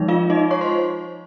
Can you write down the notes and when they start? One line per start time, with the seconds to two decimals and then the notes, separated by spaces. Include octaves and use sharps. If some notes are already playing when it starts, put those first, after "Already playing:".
Already playing: F3 G#3 D#4
0.08 F4 F5
0.30 D#4 D#5
0.51 C#5 C#6
0.61 C5 C6